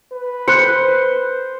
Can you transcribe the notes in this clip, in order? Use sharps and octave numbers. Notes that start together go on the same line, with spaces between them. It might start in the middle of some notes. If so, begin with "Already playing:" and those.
B4
C5 F#6 C#7